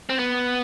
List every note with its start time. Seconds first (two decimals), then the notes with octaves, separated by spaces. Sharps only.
0.09 C4
0.19 B3